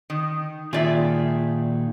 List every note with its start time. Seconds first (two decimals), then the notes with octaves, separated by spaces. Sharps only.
0.10 D#3
0.73 A#2 D#3 F4 G#4 D5 E5